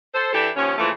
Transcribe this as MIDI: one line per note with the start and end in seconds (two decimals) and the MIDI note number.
0.14 0.29 69
0.14 0.29 72
0.33 0.49 52
0.33 0.49 62
0.33 0.49 64
0.33 0.49 67
0.33 0.49 69
0.56 0.73 39
0.56 0.73 53
0.56 0.73 61
0.78 0.90 46
0.78 0.90 49
0.78 0.90 52
0.78 0.90 53
0.78 0.90 57